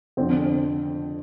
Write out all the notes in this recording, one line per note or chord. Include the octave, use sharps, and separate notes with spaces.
F2 D3 C4